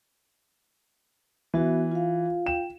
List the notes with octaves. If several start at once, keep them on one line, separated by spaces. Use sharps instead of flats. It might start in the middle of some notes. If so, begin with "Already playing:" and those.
E3 B3 F#4 E5
F4 F5
G5 E7